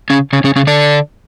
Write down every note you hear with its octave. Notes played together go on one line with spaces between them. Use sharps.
C#3 C#4
C#3 C#4
C#3 C#4
C#3 C#4
D3 D4